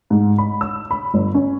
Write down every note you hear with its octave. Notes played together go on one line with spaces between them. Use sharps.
G#2
B5
E6
B5
G1
C#4